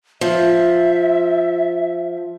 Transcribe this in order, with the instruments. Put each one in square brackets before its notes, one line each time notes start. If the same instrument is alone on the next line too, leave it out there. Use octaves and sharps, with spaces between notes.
[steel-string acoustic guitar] F3 [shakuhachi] E5